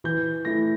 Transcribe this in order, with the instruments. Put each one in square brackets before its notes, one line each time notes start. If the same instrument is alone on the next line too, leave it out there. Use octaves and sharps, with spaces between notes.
[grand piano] E3 G6
A3 E4 A#6